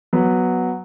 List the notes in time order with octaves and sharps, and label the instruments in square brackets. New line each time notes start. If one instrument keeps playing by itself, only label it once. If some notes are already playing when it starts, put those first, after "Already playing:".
[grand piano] F#3 B3